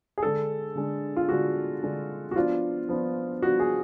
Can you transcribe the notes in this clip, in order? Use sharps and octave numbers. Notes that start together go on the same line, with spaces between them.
G#4
D3 G#3 D4 A4
D3 G#3 D4
F4
D3 G#3 D4 F#4
D3 G#3 D4
F#4
F3 B3 D4 F4
F3 B3 D4
F3 B3 D4 F#4
G#4